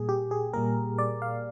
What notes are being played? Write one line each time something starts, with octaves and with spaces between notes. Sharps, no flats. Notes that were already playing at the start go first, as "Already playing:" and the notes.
Already playing: A#2 G3 A#3 G#4
G4
G#4
A#2 G3 A#3 A#4
D5
F5